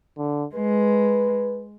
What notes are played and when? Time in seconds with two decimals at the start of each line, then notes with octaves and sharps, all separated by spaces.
0.18 D3
0.56 G#3 B4